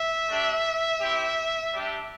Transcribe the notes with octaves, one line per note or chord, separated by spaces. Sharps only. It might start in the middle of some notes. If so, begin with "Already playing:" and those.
Already playing: E5
A3 D4 G4
C4 E4 G4
G3 D4 G4